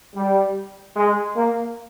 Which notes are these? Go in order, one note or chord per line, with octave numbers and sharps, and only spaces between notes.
G3
G#3
A#3